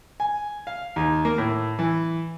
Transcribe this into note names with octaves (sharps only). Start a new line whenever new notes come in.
G#5
F5
D#2
A#3
A2
E3